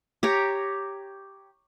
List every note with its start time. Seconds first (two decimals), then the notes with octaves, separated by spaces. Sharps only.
0.23 G4 C#5 A#5